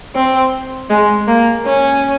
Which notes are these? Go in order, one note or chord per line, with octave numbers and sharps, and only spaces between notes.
C4
G#3
A#3
C#4